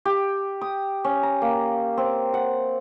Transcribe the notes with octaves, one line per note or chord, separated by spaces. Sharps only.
G4
D#6
C#4
A#5
A#3
C4
F#5